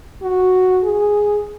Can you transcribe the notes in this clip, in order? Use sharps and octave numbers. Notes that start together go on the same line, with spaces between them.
F#4
G#4